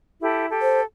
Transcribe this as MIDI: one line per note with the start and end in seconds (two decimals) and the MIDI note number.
0.21 0.46 64
0.21 0.46 67
0.21 0.46 69
0.50 0.82 67
0.50 0.82 69
0.62 0.81 72